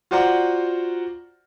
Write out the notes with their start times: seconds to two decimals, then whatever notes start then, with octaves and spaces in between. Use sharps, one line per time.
0.11 F4 F#4 C5 D5 F#5 A#5